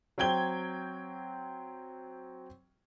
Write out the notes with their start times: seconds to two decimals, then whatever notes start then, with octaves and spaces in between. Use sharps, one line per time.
0.18 F#3 C4 G5 G#6 G7